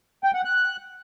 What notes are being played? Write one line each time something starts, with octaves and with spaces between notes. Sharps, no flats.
G5
F#5
F#6